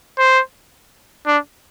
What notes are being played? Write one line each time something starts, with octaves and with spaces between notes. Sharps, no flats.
C5
D4